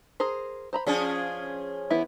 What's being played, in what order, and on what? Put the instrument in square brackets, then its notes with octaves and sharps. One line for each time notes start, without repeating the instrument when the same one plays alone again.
[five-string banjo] G#4 A#4 C5
C5 A#5 B5
[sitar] F3 C#4 G#4 [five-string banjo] D4
[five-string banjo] E3 B3 E4